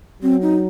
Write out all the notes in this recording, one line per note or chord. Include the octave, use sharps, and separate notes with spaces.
F#3 C4
D#4